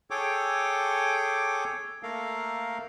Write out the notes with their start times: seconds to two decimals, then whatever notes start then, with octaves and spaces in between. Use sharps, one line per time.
0.11 G#4 A4 C#5 G5 D6
2.03 A3 A#3 A4 A#4 F5